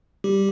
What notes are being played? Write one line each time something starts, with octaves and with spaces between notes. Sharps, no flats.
G3 G4